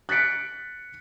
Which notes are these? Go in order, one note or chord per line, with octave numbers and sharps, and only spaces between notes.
F#6 A6 B6 C#7 D7